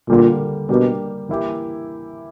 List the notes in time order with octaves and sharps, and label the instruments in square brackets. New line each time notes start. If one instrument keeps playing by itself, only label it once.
[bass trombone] A#2 [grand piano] D3 G3 A#3
[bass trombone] B2 [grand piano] G3 A#3 D4 G4
[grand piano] E3 A#3 E4 G4